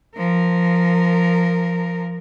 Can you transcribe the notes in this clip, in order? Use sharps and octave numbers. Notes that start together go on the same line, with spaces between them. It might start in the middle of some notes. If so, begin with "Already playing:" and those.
F3 A#4